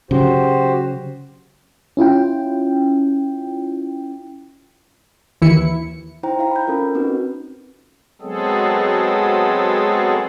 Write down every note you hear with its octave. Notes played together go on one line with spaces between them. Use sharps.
C#3 F#3 F#4 G4 C5
C#4 E4 F4 G5
D#2 E3 E4 C#7
D#4 E4 C5 G5 A#5
E4 F5 A#5
B5 G6
C#4 F4 A4 A#4
C4 C#4 D#4 F#4 B4
F#3 G#3 B3 C4 G#4 A4